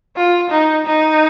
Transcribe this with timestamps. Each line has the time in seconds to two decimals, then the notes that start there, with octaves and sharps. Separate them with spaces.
0.16 F4
0.50 D#4
0.86 D#4